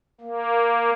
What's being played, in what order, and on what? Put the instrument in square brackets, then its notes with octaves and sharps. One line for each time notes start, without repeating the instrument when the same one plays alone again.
[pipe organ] A#3